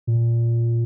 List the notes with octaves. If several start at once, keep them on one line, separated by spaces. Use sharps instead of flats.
A#2